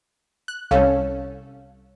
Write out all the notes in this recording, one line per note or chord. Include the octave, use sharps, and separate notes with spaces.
F#6
C2 G3 C#4 A4 C#5 F5